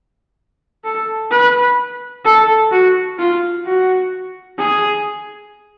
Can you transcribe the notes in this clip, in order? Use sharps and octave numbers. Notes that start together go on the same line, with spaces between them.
A4
B4
A4
F#4
F4
F#4
G#4